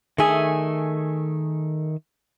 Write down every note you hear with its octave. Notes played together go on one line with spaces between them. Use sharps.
D#3 A3 G#4 E5 G#5